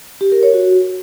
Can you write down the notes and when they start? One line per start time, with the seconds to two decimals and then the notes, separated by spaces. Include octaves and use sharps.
0.21 G4
0.32 A#4
0.43 C#5
0.54 F#4